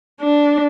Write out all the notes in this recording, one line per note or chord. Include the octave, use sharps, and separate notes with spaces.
D4